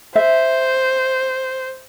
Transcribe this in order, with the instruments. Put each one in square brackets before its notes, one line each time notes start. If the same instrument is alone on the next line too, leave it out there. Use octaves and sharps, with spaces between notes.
[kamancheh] C5 [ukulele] E5